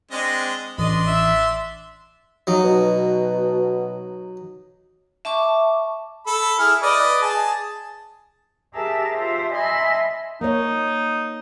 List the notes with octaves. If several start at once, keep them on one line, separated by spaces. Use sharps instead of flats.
G#3 C4 D4 D#5
A1 D4 D#5 C6
E5
F#3 D#4
B2
E5 A5 C#6 D6
A4 B5
E4 G#4 F6
B4 D5 D#5
G#4 A5
G4 G#4 A#4 E5 A5
F4 G4 C5 E5
D#5 E5 G#5 A5 B5 C6
A#3 D#4 C#5